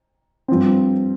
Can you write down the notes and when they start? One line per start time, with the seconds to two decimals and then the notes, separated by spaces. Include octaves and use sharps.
0.48 G2 F3 C4